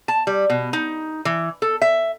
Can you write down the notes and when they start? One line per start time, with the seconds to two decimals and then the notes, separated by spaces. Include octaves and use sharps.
0.08 A5
0.27 G3
0.50 B2
0.73 D#4
1.25 E3
1.62 A4
1.82 E5